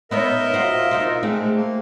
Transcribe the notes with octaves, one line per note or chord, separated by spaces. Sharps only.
B3 D#4 A#4 C#5 D#5 E5
F4 F#4 C5
D#4 F4 C5
G#3 A3 C4 G#4
A#3